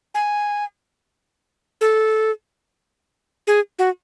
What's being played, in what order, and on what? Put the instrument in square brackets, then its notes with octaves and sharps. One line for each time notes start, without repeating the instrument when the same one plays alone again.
[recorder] G#5
A4
G#4
F#4